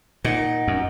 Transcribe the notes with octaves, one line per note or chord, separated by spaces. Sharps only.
A#2 D#4 A#4 F#5
F#2